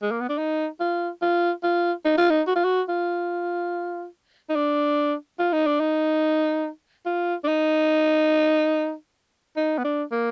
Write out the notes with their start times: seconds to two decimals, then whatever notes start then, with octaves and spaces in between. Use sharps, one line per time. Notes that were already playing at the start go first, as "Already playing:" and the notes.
0.02 G#3
0.11 A#3
0.20 B3
0.29 D4
0.38 D#4
0.80 F4
1.22 F4
1.63 F4
2.05 D#4
2.18 F4
2.30 D#4
2.47 F#4
2.56 F4
2.64 F#4
2.89 F4
4.49 D#4
4.56 D4
5.39 F4
5.53 D#4
5.67 D4
5.80 D#4
7.06 F4
7.44 D4
7.48 D#4
9.57 D#4
9.78 B3
9.84 D4
10.11 A#3